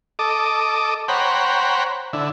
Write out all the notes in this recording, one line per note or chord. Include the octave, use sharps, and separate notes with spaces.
A4 D#5 D6
C5 C#5 F#5 G5 A#5 B5
D3 E4